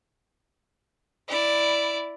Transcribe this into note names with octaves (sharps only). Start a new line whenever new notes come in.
E4 D5